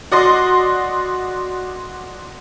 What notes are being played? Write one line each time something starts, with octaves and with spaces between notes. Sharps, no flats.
F#4 D5 D#5 C6